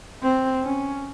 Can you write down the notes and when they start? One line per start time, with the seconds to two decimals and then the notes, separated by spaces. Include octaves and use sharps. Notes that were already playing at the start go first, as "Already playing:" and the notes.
0.23 C4
0.63 C#4